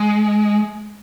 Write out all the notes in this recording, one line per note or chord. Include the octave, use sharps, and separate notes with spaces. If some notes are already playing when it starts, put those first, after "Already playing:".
Already playing: G#3